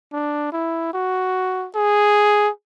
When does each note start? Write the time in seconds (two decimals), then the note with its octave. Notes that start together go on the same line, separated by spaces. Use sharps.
0.13 D4
0.53 E4
0.93 F#4
1.76 G#4